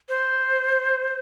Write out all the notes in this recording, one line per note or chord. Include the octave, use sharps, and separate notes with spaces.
C5